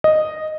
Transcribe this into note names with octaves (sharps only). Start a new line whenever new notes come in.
D#5